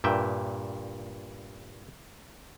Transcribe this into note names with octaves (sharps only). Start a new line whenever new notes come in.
G2 A#2 E5 G5